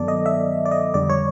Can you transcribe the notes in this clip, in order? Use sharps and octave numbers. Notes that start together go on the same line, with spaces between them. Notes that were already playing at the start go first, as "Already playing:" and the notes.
Already playing: G2 D#3 F#3 B3 A4 D5
D#5
E5
D5
D#5
F2 D3 G3 D5
C#5